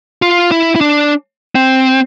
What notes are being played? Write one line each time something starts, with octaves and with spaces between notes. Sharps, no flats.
F4
E4
E4
D4
C4